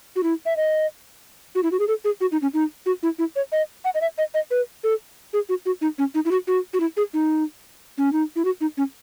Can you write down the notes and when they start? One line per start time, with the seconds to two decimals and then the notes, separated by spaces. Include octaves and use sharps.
0.16 F#4
0.23 E4
0.46 E5
0.57 D#5
1.55 F#4
1.63 E4
1.72 F#4
1.80 G#4
1.88 A4
2.05 G#4
2.21 F#4
2.32 D#4
2.42 C#4
2.54 D#4
2.86 F#4
3.03 E4
3.19 E4
3.36 C#5
3.52 D#5
3.85 F#5
3.95 D#5
4.01 E5
4.18 D#5
4.34 D#5
4.51 B4
4.84 A4
5.33 G#4
5.49 F#4
5.66 F#4
5.81 D#4
5.98 C#4
6.15 D#4
6.25 E4
6.31 F#4
6.48 F#4
6.74 F#4
6.80 E4
6.97 G#4
7.14 D#4
7.98 C#4
8.13 D#4
8.36 E4
8.45 F#4
8.61 D#4
8.77 C#4